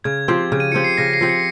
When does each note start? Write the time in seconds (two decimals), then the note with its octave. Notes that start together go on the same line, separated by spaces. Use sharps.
0.04 C#3 G#6
0.28 F3 C4 G4
0.52 C#3
0.60 D#7
0.72 F3 C4 G4 C#7
0.84 C7
0.98 C#3 A#6
1.13 C7
1.21 F3 C4 G4
1.29 C#7